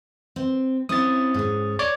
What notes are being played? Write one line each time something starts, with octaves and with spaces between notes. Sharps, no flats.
C4
C4 C#4 E4 D#6 A6
G#2 C#4
C#5 D5 D6